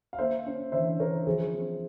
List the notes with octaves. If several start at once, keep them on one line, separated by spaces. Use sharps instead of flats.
F5
A#3 C5 E5
C#4
E3 C5 E5
E3 A#4 C#5
F3 G#4 C5
C4